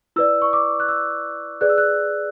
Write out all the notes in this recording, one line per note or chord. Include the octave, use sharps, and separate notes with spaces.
E4 B4 D5 E6
C#6
D6
F#6
E6
G#4 B4 D5 F#6
E6
F#6